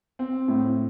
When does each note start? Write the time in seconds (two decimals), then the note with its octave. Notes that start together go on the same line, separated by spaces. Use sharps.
0.19 C4
0.48 A2